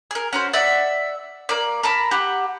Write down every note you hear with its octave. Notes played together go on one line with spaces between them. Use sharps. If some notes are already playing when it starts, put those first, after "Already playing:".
G#4 A#4
C#4 F#4 C5
D5 E5 F#5
A#3 D5
A#4 A5 B5
G4 F#5